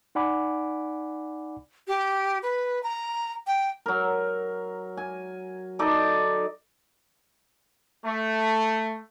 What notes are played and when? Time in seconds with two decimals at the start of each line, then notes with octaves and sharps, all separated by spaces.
0.15 D#4 D5 F#5 G#5 B5 D6
1.88 G4
2.43 B4
2.83 A#5
3.47 G5
3.86 F#3 A#4
4.97 G#5
5.79 D#4 A4 D5 D#5
8.05 A3